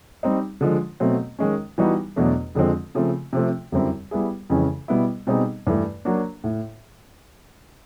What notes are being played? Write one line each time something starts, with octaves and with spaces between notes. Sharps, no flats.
G3 C4 D#4
D3 F3 G#3
B2 F#3 A3 C4
D#3 G#3 C#4
E3 G3 B3 D#4 F#4
E2 B2 F#3 A3 D4
F2 D3 F3 G#3 C4
C#3 F3 A3 C4
C3 F3 A3 C4
F#2 D3 G3 C4 E4
G3 B3 E4 G#4
F2 C#3 E3 G#3 C#4
B2 G3 B3 E4
B2 G3 C4 D#4 G#4
G2 E3 A3
F#3 A#3 D4 F#4
A2